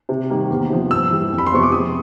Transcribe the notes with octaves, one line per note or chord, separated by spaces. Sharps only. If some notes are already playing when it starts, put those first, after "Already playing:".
C3
D#3 G3 A#3
E2
C3 F3
G2 E6
E3 G3
F2
B5
C6
C3 F3 G#3 B3 C#6
D6
C3 D#6